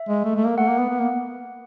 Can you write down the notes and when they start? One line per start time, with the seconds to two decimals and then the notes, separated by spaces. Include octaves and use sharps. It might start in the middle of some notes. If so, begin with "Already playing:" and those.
Already playing: E5
0.09 G#3
0.25 A3
0.36 A3
0.46 A#3
0.58 A3 F#5
0.68 A#3
0.79 B3
0.89 B3
1.00 A#3